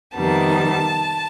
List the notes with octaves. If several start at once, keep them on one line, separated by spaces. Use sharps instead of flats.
F2 C3 D#3 G3 B3 A5